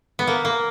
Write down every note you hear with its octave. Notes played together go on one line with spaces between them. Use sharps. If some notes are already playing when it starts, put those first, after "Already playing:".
B3
A#3
A#3